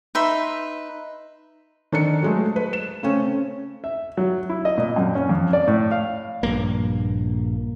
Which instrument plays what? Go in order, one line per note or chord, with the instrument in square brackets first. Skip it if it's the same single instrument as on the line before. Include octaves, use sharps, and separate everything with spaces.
[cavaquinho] D#4 B4 E5 C6
[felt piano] D#3 D4 A4 C#7
F#3 G#3 A3
B4
E7
C#3 A3 C4 C#4
[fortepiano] E5
F#3
E4
D#5
A#2
F#2
C#4
F2
D5
A2
F5
[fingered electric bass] A#1 G2 A#3